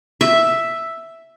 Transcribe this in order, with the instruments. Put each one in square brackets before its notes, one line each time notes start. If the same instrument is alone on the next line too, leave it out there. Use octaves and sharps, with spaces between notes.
[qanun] E5